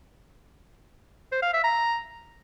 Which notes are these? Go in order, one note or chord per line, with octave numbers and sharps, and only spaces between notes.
C5
F5
E5
A#5